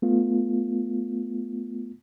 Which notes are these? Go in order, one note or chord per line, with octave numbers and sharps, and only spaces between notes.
A3 B3 F4